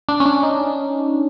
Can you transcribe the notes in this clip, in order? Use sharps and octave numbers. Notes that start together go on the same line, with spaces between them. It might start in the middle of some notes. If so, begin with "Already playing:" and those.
D4
C#4
D4
D#4